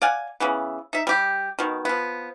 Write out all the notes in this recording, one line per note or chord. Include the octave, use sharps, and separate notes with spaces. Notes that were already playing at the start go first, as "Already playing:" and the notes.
D5 F5 F#5 G#5
C#3 E3 B3
D#4 E5
G3 G4
B2 D#3
F3 B3